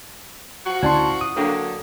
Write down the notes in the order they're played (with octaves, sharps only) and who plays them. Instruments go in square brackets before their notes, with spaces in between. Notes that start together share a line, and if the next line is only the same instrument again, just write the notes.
[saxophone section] F3 F#4
[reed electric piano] D2 A5 C6 [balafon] C#4 E4 D5
[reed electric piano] D#6
[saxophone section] D3 F#3 A#3 [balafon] D4 G5